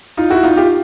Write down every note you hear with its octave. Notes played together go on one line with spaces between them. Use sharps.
D#4 F4
E4 F#4
D#4 F4
F4 G4